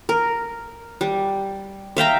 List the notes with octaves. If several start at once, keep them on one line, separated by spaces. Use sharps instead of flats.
A#4
G3
E5 F5 G5 A#5